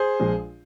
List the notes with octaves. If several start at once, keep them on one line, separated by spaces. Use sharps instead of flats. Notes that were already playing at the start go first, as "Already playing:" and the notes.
Already playing: G#4 C5
A#1 A#2 F3 G#3